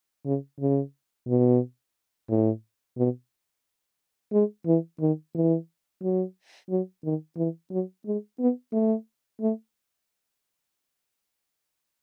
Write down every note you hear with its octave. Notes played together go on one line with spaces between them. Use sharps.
C#3
C#3
B2
A2
B2
G#3
E3
D#3
E3
F#3
F#3
D#3
E3
F#3
G#3
B3
A3
A3